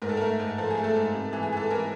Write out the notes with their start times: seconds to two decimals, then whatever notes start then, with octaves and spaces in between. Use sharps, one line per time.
0.02 G#2 A#4
0.09 A4
0.17 A3 A#4
0.40 G#2
0.58 F3 A4
0.70 G#4
0.78 A3
0.84 A4
0.96 G#2
1.15 C3
1.33 E3
1.43 G#4
1.52 E3 A4
1.70 E3 A#4